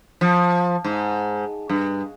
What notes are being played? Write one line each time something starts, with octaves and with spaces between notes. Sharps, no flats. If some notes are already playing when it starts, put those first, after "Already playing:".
F3
G#2
G2